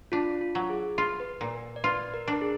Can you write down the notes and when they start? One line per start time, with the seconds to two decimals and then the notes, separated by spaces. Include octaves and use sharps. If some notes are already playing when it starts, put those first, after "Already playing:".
0.12 D4 F4
0.41 F4
0.55 F#3
0.70 G#4
0.98 F4
1.20 B4
1.41 A#2 A#4
1.76 D5
1.84 F4 B4
2.14 A#4
2.28 D4
2.33 A#4
2.41 G#4